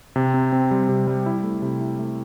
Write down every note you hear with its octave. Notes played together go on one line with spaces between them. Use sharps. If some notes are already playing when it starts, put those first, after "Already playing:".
C3
C4
C4
G3
C3
G3
E4
A3
C3
E4
A3